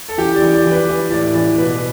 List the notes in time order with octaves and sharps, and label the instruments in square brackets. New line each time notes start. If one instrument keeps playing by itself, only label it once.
[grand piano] A4
E3 G4
D5
E3
D5
E3
B4
E3
A2 D5
E3 D5
B2 B4